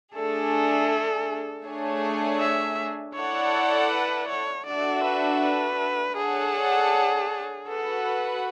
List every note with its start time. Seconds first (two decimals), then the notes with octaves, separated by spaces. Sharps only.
0.14 A3 D4 G#4 A4
1.65 A3 D4 G#4 C#5 G#5
2.40 E5
3.15 E4 A4 C#5 D5 F#5
3.91 B4
4.29 C#5
4.66 D4 F#4 A4 D5 E5
5.04 B4
5.42 B4
6.17 D4 G#4 A4 C#5 F#5 A5
7.68 F#4 A4 B4 F#5